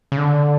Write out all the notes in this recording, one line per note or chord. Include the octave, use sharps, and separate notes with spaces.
C#3
D3